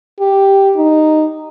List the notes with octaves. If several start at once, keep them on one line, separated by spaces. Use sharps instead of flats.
G4
D#4